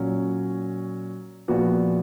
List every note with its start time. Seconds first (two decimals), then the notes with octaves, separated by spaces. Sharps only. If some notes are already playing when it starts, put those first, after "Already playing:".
Already playing: A#2 F#3 C#4
1.48 A#1 A#2 F3 B3 F#4